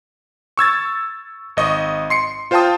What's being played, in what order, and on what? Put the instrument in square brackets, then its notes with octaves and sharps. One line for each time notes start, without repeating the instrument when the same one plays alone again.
[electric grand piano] C#6 E6 G#6 A6
G#1 D#5 C#6 D#6
C6 C7 C#7
F4 C5 F5 G5 A5 D#6